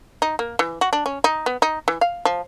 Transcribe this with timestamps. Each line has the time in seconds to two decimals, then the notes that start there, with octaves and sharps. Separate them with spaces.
0.22 D#4
0.39 A#3
0.59 E3
0.81 F#4
0.93 D4
1.06 C#4
1.24 D#4
1.46 B3
1.62 D#4
1.88 E3
2.01 F5
2.25 F3